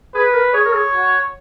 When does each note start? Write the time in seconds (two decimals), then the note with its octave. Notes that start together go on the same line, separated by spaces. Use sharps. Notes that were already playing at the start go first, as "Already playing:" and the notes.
0.14 G#4 B4
0.33 A#4
0.53 G#4 C#5
0.65 A#4
0.73 G#4
0.92 F#4